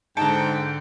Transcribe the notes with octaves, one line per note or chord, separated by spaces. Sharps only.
G#2 D3 G5 A5 A#5 C#7